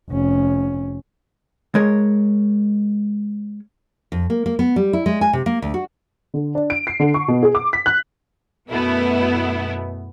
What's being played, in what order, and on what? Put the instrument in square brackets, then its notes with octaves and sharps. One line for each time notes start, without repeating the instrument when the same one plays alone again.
[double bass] F1 C#4
[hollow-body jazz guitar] G#3 A#4 C#5
[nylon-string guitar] F2
A#3
A#3
B3
G3
E4
G#3
G#5
C3
A#3
D2
F#4
[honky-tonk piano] D3
D4
D7
C7
D3
C#6
B2
G#4
D6
B6
F#6
[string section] F#2 B2 A3 B3 E4